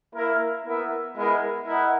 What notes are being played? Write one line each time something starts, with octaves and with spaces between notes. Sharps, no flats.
A#3 E4 A#4
B3 E4 A#4 E5
G#3 B3 E4 A#4
E4 A#4 D#5 F#5